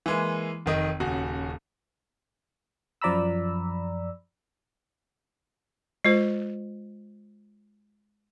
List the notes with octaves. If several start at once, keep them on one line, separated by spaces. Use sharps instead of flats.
E3 G#3 A#3
F1 D#3 D#5
D#1 C#3 F#4
F#2 F3 D5 A#5 B5 E6
G#3 F4 C5